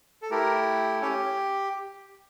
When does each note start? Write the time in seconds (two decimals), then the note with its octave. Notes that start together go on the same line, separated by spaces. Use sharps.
0.22 A4
0.30 A3 E4 G4 A#4
1.01 C#4 G4 C#5